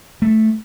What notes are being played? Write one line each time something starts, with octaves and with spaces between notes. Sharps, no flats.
A3